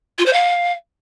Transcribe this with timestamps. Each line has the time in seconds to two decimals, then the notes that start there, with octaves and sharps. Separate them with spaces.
0.18 F4
0.25 C5
0.33 F5